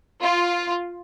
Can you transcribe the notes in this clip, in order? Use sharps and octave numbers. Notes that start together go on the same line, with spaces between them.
F4